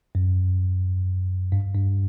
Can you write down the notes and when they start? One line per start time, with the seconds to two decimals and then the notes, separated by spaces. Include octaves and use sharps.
0.15 F#2
1.52 G2
1.75 G2